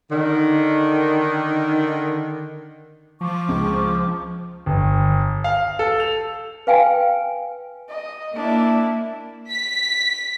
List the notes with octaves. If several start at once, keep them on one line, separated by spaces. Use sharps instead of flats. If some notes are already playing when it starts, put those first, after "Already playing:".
D3 D#3
F3 C#6 D6
C#2
G1
F5
A4
F7
B4 F5 G5 G#5
D#5
A#3 D4 E4 E5
B6